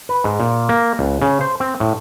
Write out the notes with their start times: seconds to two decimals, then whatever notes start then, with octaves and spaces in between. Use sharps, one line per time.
0.09 B4
0.24 G#2
0.40 A#2
0.69 A#3
0.99 C#2
1.22 C#3
1.41 C5
1.60 C4
1.80 A2